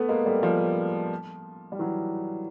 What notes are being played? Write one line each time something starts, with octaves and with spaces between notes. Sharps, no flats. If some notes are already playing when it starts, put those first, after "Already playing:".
Already playing: A3 B3
G#3 A#3
G3 A3
F3 G3
G3
E3 F#3